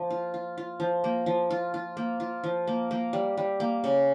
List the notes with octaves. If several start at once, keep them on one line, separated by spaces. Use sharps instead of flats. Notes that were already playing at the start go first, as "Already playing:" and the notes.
Already playing: F3 A#3
F4
F4
F4
F3
A#3
F3
F4
F4
A#3
F4
F3
A#3
A#3
G3
G3
A#3
C#3